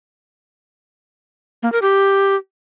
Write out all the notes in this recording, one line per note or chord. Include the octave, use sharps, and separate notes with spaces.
A#3
A#4
G4